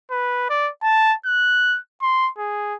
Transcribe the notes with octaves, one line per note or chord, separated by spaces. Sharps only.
B4
D5
A5
F#6
C6
G#4